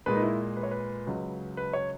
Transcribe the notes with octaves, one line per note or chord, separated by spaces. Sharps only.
A#2 G#3 B4
D#4
E4
B4
C#5
B4
C#2 C#3 F#3
B4
C#5